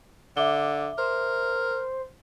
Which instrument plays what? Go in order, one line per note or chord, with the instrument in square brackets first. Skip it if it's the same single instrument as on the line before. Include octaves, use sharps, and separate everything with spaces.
[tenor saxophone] D3 [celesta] E5 D6 G7
[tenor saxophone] A#4 [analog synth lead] C5